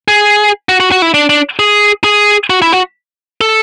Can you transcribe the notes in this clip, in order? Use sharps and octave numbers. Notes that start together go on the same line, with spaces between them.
G#4
F#4
F#4
F#4
E4
D4
D4
G#4
G#4
F#4
E4
F#4
A4